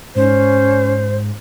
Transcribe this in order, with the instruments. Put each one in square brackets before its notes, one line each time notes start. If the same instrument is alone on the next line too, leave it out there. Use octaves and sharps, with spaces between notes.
[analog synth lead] G#2 [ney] C#4 [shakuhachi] C5